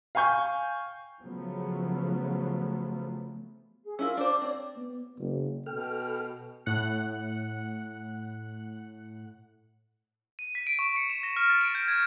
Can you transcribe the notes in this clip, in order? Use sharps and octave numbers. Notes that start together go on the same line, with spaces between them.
F5 G5 G#5 C#6 G6
C#3 F3 F#3 A3 B3
G#4
C#4 E4 F4 A#4 E6
D4 C5 D6
C4 C#5 D5
B3
F#1
B2 A4 G5 F6
A2 F#5 F#6 C#7
D#7
B6
D7
C#6
C#7
E7
A#6
F6
A6
D7
G6
G#6